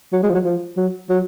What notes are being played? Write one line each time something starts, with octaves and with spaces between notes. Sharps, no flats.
F#3
G#3
F3
F#3
F3
F#3
F#3